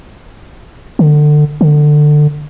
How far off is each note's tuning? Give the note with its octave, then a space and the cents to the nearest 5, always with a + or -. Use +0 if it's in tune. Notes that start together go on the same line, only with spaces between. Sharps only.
D3 +25
D3 +20